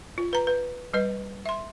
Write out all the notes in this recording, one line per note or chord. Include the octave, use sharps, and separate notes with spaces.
F4
B4 A#5
B4
G3 B4 D#5
E5 C6